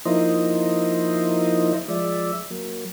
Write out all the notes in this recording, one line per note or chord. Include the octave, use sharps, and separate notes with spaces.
F3 A#3 D#4 E4 C5 D#5
F3 G#3 D5 E5
F#3 A#3